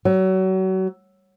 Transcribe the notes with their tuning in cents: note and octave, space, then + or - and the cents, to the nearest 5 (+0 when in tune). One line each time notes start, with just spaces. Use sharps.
F#3 +30